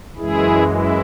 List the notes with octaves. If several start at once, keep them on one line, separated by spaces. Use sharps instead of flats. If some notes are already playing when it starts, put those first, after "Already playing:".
F#2 E3 G#3 E4 G#4
E4